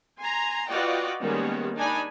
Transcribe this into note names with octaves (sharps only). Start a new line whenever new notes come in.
G#5 A#5 C6
F4 F#4 B4 D5 D#5 G5
D#3 G3 G#3 A#3 B3 C#4
D4 D#4 G#5 B5